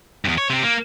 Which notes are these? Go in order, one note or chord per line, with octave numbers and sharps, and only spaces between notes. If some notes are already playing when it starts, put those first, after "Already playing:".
E2 G2
C#5
C3 C4
A#3